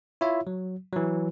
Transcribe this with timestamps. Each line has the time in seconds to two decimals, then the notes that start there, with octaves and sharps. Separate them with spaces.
0.21 E4 F4 C#5 E5
0.47 F#3
0.93 E3 F#3